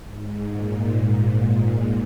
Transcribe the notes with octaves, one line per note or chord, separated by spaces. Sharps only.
G#2
A#2